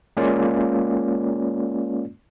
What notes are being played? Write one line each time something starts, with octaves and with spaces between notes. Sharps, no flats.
G#3 A#3 C#4 F4 D5